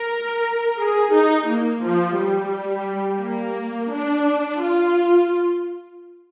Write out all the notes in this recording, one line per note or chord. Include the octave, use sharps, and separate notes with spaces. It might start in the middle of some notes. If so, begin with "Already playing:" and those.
Already playing: A#4
G#4
D#4
A#3
F3
G3
A#3
D4
F4